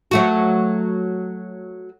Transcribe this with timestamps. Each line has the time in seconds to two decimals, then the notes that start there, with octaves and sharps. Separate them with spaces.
0.11 F#3 A3 F#4